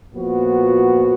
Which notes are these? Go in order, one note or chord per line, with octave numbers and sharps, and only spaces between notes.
A#2 F3 B3 F#4